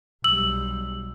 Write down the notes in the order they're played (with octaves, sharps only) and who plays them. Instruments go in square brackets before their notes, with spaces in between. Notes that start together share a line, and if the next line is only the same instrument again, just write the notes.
[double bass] B1 G3 [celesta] E6 F#7